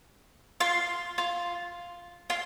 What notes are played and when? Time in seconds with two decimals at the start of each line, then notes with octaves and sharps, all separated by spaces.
0.60 F4
1.18 F4
2.30 F4